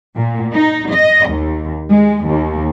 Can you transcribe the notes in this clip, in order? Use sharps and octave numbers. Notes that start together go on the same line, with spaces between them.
A#2
D#4
D#5
D#2
G#3
D#2